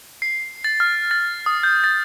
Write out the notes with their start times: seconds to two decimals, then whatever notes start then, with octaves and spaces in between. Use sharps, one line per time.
0.22 C7
0.64 A6
0.80 F6
1.11 A6
1.46 D#6
1.63 G6
1.84 A6